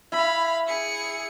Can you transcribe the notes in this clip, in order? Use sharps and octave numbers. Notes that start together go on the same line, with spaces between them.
E4 F5 B5
G#4 C#7